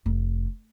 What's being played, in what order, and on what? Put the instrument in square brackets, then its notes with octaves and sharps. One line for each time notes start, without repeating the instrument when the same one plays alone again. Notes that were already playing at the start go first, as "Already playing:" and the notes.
[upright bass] F1